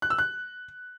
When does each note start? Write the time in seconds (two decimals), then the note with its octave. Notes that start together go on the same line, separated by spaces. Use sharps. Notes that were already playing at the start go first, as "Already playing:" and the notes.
0.02 F#6
0.10 E6
0.18 F#6